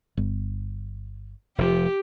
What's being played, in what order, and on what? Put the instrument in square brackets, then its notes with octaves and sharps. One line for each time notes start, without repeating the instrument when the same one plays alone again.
[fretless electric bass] G1
[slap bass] F1 F3 [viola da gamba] G4